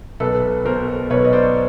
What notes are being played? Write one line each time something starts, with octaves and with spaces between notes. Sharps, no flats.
B1 A4 B4
B2 A#4 C5
B1 B4 C#5
D#5
C5 D5